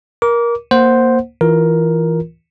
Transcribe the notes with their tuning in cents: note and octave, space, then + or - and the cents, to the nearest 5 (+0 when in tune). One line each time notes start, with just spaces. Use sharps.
A#4 +20 D6 -25
A#3 +0 C5 +0 F#5 +0
E3 -5 F4 +0 A#4 +10